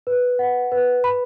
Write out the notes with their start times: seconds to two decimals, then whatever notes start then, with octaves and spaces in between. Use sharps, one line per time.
0.07 B4
0.39 F#5
0.72 B4
1.04 B5